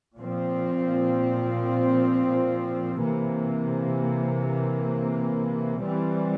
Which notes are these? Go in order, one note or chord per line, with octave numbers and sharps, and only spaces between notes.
A#2 F3 C4
C3 E3 A#3
E3 G3 C4